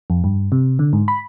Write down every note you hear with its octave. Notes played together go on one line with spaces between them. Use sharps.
F2
G2
C3
D3
G#2
B5